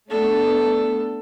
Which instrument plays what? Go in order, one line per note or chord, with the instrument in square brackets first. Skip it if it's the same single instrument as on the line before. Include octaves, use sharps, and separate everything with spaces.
[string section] A3 B3 D4 [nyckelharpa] A4